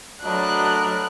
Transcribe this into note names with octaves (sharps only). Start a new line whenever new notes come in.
F#3 A3 D4 A#4 B4 D#5 A#5 F#6